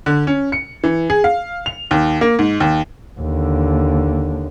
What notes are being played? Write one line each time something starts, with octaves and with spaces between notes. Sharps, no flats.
D3
C#4
C#7
E3
G#4
F5
F7
D#2
A#3
G#2
D#2
D#2 D3